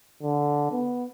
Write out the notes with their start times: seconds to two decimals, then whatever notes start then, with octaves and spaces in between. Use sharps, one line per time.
0.23 D3
0.71 B3